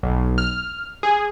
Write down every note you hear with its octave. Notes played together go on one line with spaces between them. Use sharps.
B1
F6
G#4